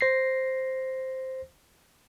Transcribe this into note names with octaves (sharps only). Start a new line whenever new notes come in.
C5 A#6 C7